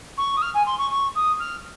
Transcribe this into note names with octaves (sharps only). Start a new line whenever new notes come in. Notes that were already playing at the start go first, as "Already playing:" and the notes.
C#6
D#6
F6
G#5
C6
C#6
C#6
D#6
F6